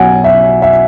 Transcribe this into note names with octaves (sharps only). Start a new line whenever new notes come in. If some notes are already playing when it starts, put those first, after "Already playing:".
Already playing: B1 B2 F#3 F#5 G#5
E5
E5